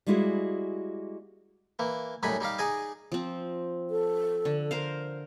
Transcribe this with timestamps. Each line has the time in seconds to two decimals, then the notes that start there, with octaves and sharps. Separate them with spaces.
0.07 G3 G#3 A#3 E4 F#4 G#4
1.79 E3 A#3
2.23 F#2 A2 G3 D#4 G#5 B5
2.40 G3 D#4 G4 F5
2.58 D#4 G#4 D5 D#5 G#5
3.12 F3 C4
3.90 A4
4.45 D3
4.71 A#4 C5 F5